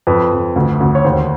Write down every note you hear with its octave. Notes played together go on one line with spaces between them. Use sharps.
F2 B4
F2
D2
D2
C#5
D#2 C5